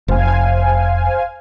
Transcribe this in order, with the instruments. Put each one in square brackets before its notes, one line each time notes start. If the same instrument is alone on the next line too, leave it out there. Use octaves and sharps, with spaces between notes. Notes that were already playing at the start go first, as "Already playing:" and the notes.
[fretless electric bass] F1 [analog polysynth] C5 F5 G#5